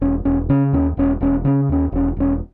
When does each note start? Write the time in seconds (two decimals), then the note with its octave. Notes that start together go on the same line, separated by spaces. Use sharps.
0.01 E1 C#4
0.25 E1 C#4
0.49 C#3 C#4
0.73 D#2 C#4
0.97 E1 C#4
1.21 E1 C#4
1.45 C#3 C#4
1.69 D#2 C#4
1.92 E1 C#4
2.17 E1 C#4